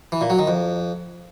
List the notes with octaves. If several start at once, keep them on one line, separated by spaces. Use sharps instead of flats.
E3
A#2
F#3
D#3
F2